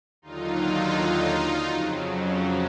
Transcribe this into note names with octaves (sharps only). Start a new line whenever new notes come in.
D#2 D3 F#3 D#4 F4
F2 C#3 F#3